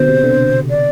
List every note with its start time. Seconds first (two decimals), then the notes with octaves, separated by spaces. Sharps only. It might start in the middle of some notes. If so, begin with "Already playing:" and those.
Already playing: B2 D3 C5
0.08 C3
0.24 D3
0.70 D5